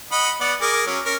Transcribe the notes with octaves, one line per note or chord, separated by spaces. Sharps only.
D#5 F#5 B5
B3 D5 F#5
G#4 A#4 D6
F#3 C#4
C#4 A#4